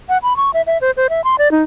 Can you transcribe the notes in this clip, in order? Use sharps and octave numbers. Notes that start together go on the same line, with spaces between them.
F#5
B5
C#6
E5
E5
C5
C5
E5
C6
D5
D#4